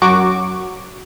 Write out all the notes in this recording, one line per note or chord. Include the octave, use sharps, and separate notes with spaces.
F#2 F#3 F#4 C#6 D6 D7